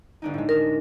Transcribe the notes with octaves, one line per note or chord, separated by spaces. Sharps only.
G1 D4 D#4
A2 G#3
A#4